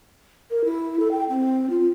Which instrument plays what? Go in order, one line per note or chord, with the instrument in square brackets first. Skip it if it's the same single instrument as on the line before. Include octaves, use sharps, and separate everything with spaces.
[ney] A#4
E4
A4
G5
C4
F4